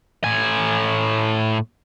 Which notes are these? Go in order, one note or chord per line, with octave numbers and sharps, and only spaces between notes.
A2 G#5